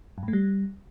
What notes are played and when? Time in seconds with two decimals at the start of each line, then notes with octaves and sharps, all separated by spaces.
0.18 F#2
0.23 G#2
0.28 A3
0.33 G3